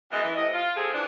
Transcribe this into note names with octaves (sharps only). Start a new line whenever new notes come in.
F#2 E3 G#3 B3 D#5
E3
A2 C3 D#5
F4
F3 A3 C4 G4 G#4
E3 F3 D4